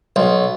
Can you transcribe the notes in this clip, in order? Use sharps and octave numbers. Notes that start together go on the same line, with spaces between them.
B1